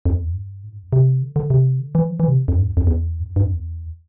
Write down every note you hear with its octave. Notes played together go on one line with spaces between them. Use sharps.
F2
E2
F2
G2
A2
G2
F2
C3
D3
D3
C3
D3
E3
F3
E3
C3
F2
G2
E2
F2
E2
G2
F2
G2
F2
E2